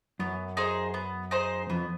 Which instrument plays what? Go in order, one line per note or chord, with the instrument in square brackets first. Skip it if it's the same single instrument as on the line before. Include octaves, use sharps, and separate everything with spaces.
[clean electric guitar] F#2 [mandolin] B3
[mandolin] D#4 G#4 C5
B3
D#4 G#4 C5
[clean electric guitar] F2 [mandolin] B3